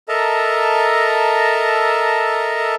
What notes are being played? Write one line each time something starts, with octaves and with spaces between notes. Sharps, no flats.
A4 A#4 D#5 E5 A5 A#5